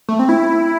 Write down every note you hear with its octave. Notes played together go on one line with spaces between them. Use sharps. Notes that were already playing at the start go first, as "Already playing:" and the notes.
A3
C4
E4